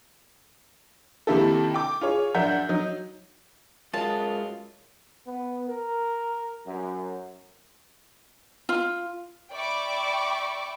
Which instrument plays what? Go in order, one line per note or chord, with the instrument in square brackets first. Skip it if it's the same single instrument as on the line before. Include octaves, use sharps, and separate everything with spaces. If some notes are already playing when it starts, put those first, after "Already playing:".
[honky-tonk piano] C3 D#3 A#3 E4 G4 A4
G5 D6
F4 G#4 C#5
F#2 D4 A#4 E5 F#5 G6
F#3 D#4
[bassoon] F#2 [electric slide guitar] G#3 F4 [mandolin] A5
[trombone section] B3
A#4
F#2
[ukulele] F4
[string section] D5 E5 G5 B5 C#6 D6